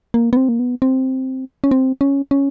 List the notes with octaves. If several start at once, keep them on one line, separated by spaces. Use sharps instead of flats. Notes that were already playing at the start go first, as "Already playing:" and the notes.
A#3
B3
C4
A#3
B3
C4
C#4
C4
C#4
C#4